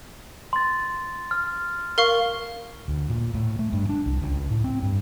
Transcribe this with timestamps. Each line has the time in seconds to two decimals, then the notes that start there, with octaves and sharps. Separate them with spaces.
0.53 C6 A6
1.31 F6
1.98 A#4 F5 C#6
2.88 D2
3.10 A#2
3.34 A2
3.59 A3
3.73 G2
3.89 D4
4.06 C2
4.22 C#2
4.50 A2
4.64 C4
4.82 G2